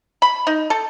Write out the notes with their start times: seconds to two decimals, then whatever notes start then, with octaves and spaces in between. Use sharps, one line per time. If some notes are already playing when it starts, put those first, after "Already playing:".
0.22 B5
0.47 D#4
0.70 A4